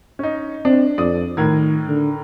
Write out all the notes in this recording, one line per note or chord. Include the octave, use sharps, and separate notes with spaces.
C#4 D#4
C4 D4
F2 D5 D#6
A2 D#3 A#4 G#6
D3